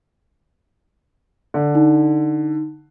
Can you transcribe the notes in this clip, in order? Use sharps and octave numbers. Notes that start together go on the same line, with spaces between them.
D3
D#4